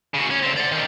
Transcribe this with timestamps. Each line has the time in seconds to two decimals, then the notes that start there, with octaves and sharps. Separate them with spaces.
0.15 C#3 F#4
0.31 C#4
0.43 D2 C4
0.57 D5 F#5
0.71 D#3 G3